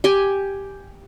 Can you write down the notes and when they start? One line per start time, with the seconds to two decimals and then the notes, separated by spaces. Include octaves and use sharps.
0.04 G4 G5 G#5